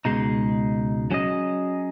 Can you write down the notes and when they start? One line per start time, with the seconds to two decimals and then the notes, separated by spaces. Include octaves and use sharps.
0.05 C#2 B2 G#3 D#4
1.11 F#3 C#4 G#4 D#5